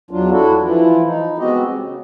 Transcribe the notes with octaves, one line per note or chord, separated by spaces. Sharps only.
E2 F#3 D4 F4
D4 E4 F#4 A4
E3 F3 E4 F4
D#4
G#3 B3 C4 F#4 G4 D#5
C#3